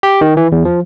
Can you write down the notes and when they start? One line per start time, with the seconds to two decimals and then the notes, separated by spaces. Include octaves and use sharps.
0.03 G4
0.21 D#3
0.37 E3
0.52 E2
0.65 F3